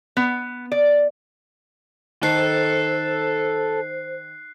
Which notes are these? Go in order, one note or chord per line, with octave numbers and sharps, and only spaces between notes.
B3
D5
D#3 A4 C5 F#6 C7